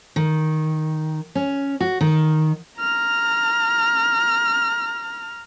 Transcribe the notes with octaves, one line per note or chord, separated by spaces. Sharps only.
D#3
C#4
F#4
D#3
A#5 F6